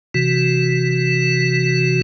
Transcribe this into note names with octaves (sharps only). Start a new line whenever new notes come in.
C3 E3 F#4